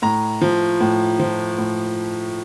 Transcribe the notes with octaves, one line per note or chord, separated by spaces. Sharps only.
A2 A#5
F3
A2
F3
A2